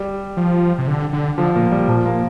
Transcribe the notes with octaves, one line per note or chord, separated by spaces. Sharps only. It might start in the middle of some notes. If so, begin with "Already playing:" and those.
Already playing: G3
F3
C3
D3
D3
D3 F3
A#2 A#3
G3
A#2 F3
A#3